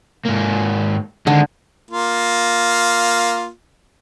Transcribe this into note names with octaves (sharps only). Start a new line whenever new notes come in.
G#2 A#3
D3 D#3 G#3
A#3 F4